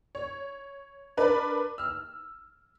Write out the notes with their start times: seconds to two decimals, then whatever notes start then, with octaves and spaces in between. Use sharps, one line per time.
0.15 C#5
1.17 D4 A#4 B4
1.78 E6 F6